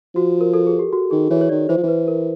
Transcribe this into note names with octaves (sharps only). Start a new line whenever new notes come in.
F3 F#4
A#4
A4
G#4
G4
F#4
D#3 G#4
E3 C#5
C#5
D#3 D5
E3 C5
F3
E3 B4
A#4